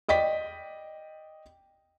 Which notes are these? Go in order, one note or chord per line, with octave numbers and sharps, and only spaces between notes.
D5 D#5 G5 B6